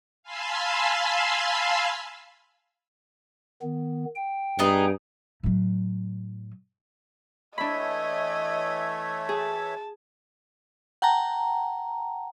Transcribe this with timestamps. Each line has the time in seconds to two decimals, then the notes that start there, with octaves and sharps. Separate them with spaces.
0.23 F5 G#5 A5 B5 C6 E6
3.62 D#3 B3
4.15 G5
4.59 G2 B3 D#4 G#4
5.43 A2 F#3
7.58 E3 A3 D4 C#5 D#5 E5 B5
9.29 G#4 A5
11.02 F#5 G5 A5 A#5